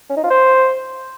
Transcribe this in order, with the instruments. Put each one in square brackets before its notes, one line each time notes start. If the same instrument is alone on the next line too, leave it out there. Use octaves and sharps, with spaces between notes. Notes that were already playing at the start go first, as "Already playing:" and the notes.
[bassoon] C#4
D#4
F4
C5